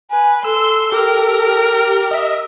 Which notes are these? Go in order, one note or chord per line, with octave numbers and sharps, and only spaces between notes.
B4 G#5
A4 C6 E6
G4 A#4
D#5 E5